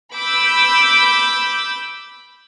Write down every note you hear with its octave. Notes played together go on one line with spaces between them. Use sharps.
B5 D6 E6 G6